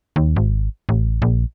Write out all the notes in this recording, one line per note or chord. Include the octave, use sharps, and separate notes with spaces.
D#2
G#1
A1
A#1